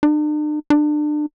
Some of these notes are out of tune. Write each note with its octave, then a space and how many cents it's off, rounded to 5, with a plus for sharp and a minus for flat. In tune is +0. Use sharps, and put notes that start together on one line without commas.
D4 +45
D4 +30